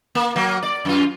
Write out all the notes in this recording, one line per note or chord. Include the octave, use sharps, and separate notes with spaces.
A#3
F#3 A#3
D5
F#2 F4